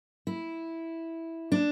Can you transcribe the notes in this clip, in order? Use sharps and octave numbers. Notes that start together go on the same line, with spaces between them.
E4
D4